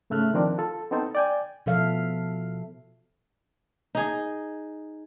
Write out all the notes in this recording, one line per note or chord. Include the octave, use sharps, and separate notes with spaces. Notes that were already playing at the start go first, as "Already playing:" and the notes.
G#2 C#3 A3 E5 F6 F#6
D#3 F3 C4 D4 A#4
F4 A4
B3 C4 D#4 A4 C5
D5 G5 G#5
B2 F3 A4 E5 F5
D#4 G#4